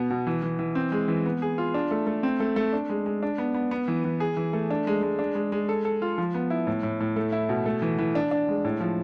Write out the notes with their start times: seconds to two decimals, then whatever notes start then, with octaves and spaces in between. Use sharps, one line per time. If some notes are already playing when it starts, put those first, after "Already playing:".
Already playing: B2 B3
0.10 B2
0.27 E3
0.43 E3
0.59 E3
0.75 C4
0.92 G#3
1.08 E3
1.26 B3
1.42 G#4
1.58 F4
1.74 D4
1.91 A3
2.07 A3
2.23 C4
2.40 A3
2.56 A3
2.73 D4
2.89 G#3
3.06 G#3
3.23 D4
3.38 B3
3.55 B3
3.71 B3
3.88 E3
4.04 E3
4.20 G#4
4.37 E3
4.53 A3
4.70 D4
4.87 G#3
5.03 G#3
5.19 D4
5.35 G#3
5.52 G#3
5.69 A4
5.85 A4
6.02 F4
6.18 F3
6.34 B3
6.50 E4
6.67 A2
6.83 A2
7.00 A2
7.16 A3
7.32 E4
7.49 B2
7.66 A3
7.82 E3
7.99 E3
8.15 D4
8.31 D4
8.49 G#3
8.65 A2
8.80 F3